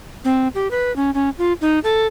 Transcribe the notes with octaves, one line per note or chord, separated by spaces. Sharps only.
C4
G4
B4
C#4
C#4
F4
D#4
A4